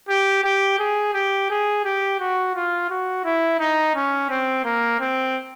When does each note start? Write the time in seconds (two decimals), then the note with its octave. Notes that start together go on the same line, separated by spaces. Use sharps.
0.09 G4
0.44 G4
0.79 G#4
1.14 G4
1.50 G#4
1.85 G4
2.20 F#4
2.56 F4
2.90 F#4
3.25 E4
3.60 D#4
3.95 C#4
4.30 C4
4.65 A#3
5.00 C4